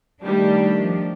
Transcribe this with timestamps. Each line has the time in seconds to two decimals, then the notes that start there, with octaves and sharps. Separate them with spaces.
0.23 D#3 G3 A3 D4 G4
0.79 F3